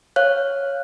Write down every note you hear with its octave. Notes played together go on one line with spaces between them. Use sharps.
C#5 F5 F#6